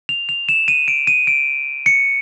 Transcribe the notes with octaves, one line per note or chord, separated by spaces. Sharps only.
F7
F7
E7
D#7
D7
D#7
D7
C#7